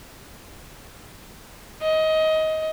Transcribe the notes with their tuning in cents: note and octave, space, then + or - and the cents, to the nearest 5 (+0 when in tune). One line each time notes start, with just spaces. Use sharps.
D#5 +20